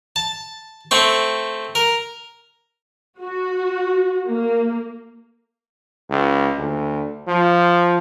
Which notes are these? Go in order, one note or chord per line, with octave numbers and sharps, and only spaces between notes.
A5
A3 C4 C#6
A#4
F#4
A#3
C#2
D2
F3